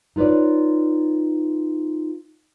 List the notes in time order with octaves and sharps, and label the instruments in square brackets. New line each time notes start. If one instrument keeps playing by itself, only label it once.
[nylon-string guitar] D#4 F4 B4 C#5 D5